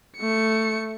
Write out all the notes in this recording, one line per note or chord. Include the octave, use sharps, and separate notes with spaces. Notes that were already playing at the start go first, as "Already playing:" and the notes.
A3 C#7